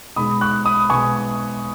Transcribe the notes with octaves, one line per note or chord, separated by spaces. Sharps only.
B2 G#3 D#4 B5 D#6
C#6 F#6
B5 D#6
B2 G#3 D#4 G#5 C#6